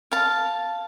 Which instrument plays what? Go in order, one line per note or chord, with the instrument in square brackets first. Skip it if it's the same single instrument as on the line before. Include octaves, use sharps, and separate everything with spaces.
[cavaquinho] F5 A5